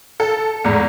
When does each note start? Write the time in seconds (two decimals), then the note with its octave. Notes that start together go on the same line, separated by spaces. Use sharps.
0.20 A4
0.65 E2 G#2